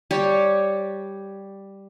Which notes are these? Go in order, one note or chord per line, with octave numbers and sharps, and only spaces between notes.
G3 G4 C#5